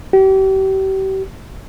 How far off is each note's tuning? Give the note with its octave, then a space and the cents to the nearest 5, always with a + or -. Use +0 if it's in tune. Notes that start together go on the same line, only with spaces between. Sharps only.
G4 -35